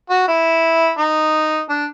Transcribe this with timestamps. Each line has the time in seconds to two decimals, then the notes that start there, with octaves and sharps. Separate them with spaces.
0.10 F#4
0.28 E4
0.98 D#4
1.69 D4